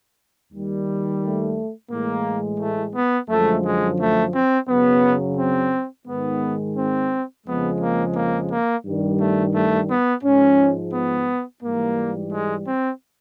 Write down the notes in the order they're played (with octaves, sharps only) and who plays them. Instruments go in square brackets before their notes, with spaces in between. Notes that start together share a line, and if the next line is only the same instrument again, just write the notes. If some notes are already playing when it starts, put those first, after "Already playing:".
[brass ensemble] D#2 D#3 G3
A3
A2 E3 G#3 A#3
A3
B3
F#2 D3 F3 G#3 A3
G#3
A3
C4
F#2 C#3 F#3 B3
C4
G#2 D#3 G#3 B3
C4
F2 C#3 F3 G#3 B3
A#3
A#3
A#3
G2 D#3 G3
A3
A3
B3
G#2 F3 G#3 C#4
B3
G#2 E3 G3 A#3
G#3
C4